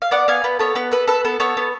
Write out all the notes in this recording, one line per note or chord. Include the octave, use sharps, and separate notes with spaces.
F5
B3 D5 F#5
B3 F5 G#5
B3 B4
B3 A4 C#5
B3 B4
A4 B4
A4 B4
B3 A4
B3 A4 C#5
B3